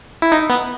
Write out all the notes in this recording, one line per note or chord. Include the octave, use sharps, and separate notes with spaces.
E4
D#4
B3